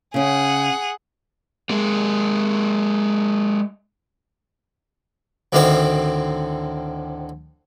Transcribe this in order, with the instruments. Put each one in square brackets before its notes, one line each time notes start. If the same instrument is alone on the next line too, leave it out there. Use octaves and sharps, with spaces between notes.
[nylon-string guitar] C#3 C#4 [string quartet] G#4 F#5
[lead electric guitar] G#3 A#3
[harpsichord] D2 A2 D3 D#3 C4 D#6